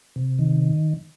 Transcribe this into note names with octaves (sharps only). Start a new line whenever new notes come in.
C3
D#3